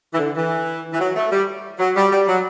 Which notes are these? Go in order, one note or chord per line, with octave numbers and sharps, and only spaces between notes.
E3
D3
E3
E3
F#3
A3
G3
F#3
G3
G3
F#3